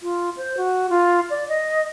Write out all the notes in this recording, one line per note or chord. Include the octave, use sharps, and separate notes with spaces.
F4
C5
F#4
F4
D5
D#5